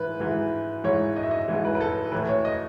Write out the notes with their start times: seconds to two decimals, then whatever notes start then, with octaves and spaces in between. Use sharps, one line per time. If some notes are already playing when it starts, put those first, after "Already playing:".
Already playing: G#2 E3 B4
0.20 G#2 E3
0.84 G#2 E3 C#5
1.16 D#5
1.23 E5
1.31 D#5
1.48 G#2 E3
1.65 B4
1.75 B4
1.80 A4
2.12 A2 E3 B4
2.29 C#5
2.45 D#5